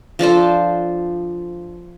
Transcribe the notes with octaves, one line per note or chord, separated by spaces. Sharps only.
F3 D4 A4 C5